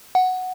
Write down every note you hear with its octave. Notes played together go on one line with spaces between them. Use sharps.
F#5